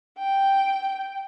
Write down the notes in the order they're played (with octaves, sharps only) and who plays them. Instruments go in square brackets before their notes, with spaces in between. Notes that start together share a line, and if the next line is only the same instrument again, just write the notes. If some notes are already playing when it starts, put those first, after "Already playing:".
[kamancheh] G5